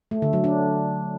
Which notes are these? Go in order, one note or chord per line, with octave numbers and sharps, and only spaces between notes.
A3
D3
F#3
D4